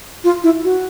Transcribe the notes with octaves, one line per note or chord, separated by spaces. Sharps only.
F4
E4
F#4